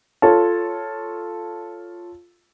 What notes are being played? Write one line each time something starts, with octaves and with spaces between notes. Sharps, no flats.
F4 A4 C#5 A5